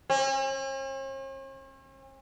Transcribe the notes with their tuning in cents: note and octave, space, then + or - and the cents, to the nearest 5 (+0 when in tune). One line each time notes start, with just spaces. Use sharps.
C#4 -45